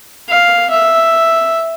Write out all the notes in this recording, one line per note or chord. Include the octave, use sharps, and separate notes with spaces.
F5
E5